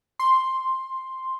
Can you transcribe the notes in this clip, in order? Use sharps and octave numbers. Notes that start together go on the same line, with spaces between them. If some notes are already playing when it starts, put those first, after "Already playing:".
C6